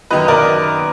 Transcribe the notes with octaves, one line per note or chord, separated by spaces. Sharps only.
F#2 D#3 F#3 B4 D#5
A#4 D5